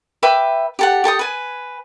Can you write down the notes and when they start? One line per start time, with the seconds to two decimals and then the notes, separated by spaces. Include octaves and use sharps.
0.23 B4 E5 G5 D6
0.79 G4 A4 F#5
1.04 G4 A4 G5 D#6
1.19 B4 G#5